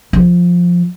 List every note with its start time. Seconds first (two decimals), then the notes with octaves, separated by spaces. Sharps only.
0.13 F3